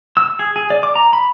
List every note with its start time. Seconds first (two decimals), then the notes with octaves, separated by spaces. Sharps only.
0.17 E6
0.39 G#4
0.56 G#4
0.70 D5
0.83 D6
0.95 A#5
1.13 B5